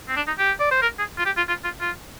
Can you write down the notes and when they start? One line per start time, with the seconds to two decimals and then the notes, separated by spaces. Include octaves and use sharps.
0.08 C4
0.16 D4
0.27 D#4
0.38 G4
0.60 D5
0.71 C5
0.82 A#4
0.99 G#4
1.18 F4
1.26 G4
1.37 F4
1.48 F4
1.64 F4
1.81 F4